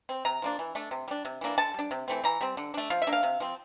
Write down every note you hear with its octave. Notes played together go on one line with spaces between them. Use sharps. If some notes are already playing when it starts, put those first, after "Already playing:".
C4
C3 A#5
F3 A#3 D4
E3
A3 D4
C3
G3 D4
C3
E3 A#3 D4
D3 A5
G3 D4
C3
E3 A3 C4
E3 A#5
G3 C4
D3
A3 D4
F3 F5
E5
A#3 D4
F5
C3
F3 C4